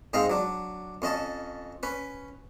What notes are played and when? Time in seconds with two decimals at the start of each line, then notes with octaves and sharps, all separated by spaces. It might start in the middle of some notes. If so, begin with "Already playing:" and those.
0.13 G#2 G#3 C4 D#5 F5 A#5
0.30 F#3 D4
1.02 F2 C#4 D#5 A5
1.83 C#4 B4